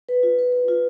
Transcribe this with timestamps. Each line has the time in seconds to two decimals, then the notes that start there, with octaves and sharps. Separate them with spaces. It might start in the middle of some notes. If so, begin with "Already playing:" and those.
0.09 B4
0.23 F4
0.39 B4
0.52 B4
0.68 F4